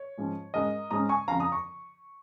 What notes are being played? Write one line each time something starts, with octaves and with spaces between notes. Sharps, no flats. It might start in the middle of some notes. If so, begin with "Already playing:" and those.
Already playing: C#5
G#2 F3 C#4
G#2 G#3 C#4 A#4 D#5
G#2 G#3 C#4 A#5 D#6
G#5 C#6
F2 C#3 F3 F5 A#5
A#5 D#6
C#6